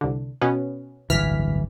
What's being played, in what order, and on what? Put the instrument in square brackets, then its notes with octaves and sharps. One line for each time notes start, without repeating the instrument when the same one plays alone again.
[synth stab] C2 D3
B2 B3 C#4
[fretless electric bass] D1 G1 E3 [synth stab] F6 B6